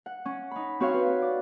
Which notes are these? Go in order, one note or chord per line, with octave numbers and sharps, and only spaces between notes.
F#5
C#4
D#4 B5
C4 F#4 C#5 F5
B4
D5